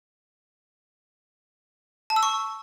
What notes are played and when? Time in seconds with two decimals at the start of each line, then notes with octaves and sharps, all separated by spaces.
2.10 A5
2.16 E6
2.23 C#6